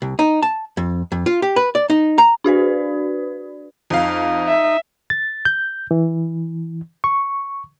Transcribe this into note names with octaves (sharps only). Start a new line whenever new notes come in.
C2
D#4
A5
F2
F2
F4
G4
B4
D5
D#4
A#5
D4 F#4 B4 D5
F2 D#4 F5
E5
A6
G6
E3
C#6